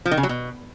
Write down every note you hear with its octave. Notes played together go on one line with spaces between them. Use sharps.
F3
D#3
C#3
F#3
B2